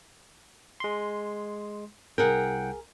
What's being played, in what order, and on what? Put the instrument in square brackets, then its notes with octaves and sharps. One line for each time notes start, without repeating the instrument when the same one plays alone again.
[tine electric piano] G#3 C6
[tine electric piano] C2 F#5 G5 [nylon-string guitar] G#4 A#4